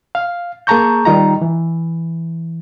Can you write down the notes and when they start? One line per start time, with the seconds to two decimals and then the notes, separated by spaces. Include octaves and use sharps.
0.15 F5
0.67 A#3 G#4 A5 A#5 C#6 G6
1.05 D#3 G3 D#4 F4 D#5 A#5
1.42 E3